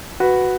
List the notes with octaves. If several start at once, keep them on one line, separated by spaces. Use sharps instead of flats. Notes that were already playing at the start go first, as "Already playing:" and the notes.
F#4 B4